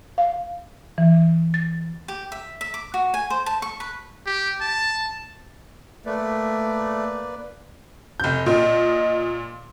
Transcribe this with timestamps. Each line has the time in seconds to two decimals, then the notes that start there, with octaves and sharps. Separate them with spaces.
0.18 F5
0.98 E3
1.54 A6
2.08 G4
2.32 E5
2.61 E5
2.74 D6
2.94 F#4
3.14 G#5
3.30 C5
3.46 A5
3.62 C#6
3.80 B4
4.26 G4
4.61 A5
6.06 A3 A#3 B4 D5
8.20 F1 G6
8.46 A#2 D#5